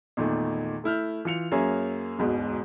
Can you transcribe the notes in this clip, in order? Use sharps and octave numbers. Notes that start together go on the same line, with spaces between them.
E2 A#2 D#3 A3
A3 E4 F6 G6
E3 F4 C#7 F7
F#2 A#3 G#4 C#5 E5 G#5
E1 D2 G#2 B2